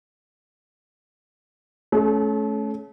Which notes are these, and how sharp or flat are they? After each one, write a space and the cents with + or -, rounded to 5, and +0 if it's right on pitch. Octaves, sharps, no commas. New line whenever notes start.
A3 -30 C#4 +0 G#4 +45